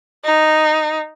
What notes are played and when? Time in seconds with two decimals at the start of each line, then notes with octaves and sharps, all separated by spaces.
0.25 D#4